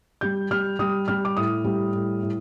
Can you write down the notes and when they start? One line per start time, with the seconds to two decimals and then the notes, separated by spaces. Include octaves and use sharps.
0.21 G3 G6
0.51 G3 F6
0.79 G3 D#6
1.08 G3 F6
1.25 D6
1.37 A2 D#6
1.64 G3
1.93 A2
2.23 A2